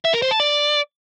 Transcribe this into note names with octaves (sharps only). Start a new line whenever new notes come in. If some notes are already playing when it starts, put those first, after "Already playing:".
E5
A#4
C5
A5
D5